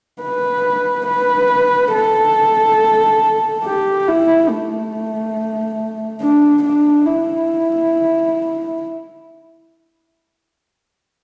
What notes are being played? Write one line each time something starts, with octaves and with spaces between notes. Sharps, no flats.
B4
B4
A4
G4
E4
A3
D4
D4
E4